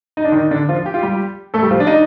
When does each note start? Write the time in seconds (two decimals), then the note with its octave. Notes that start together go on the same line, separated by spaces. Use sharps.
0.17 D#4
0.25 D4
0.32 D#3 D#4
0.51 D3 D4
0.69 F3 F4
0.86 G4
0.94 F4
1.03 G3 G4
1.54 A3 A4
1.62 G3 G4
1.71 F3 F4
1.80 D4
1.87 D#4